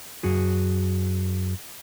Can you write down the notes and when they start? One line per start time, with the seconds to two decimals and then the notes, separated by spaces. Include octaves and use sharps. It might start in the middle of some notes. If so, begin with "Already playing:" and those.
0.23 F#2 F#4 G#4